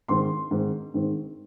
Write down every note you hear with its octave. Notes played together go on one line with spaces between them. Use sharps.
G#2 D#3 C4 C6
G#2 D#3 C4
G#2 D#3 C4